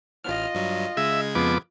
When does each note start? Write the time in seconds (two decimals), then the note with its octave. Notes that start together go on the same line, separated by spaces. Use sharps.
0.24 A1 F4 D#5 F6
0.55 G2 F#3
0.97 C#3 G#3 E5 G#6
1.35 F2 B3 D6